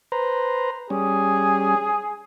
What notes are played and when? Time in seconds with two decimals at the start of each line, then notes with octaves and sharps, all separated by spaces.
0.12 B4 C5 A#5
0.90 G3 C#4 G#4